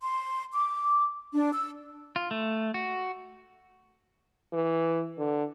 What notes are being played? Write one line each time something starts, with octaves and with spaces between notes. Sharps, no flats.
C6
D6
D4
E6
F4
A3
F#4
E3
D3